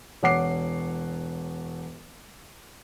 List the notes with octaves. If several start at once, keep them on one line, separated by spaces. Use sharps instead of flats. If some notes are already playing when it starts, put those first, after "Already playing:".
E1 C#5 F#5 D6 C7